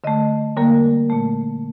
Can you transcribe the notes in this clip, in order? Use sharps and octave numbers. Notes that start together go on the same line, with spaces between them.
D3 A3 D#5
D3 G3 A#3 A#4
A#2 A3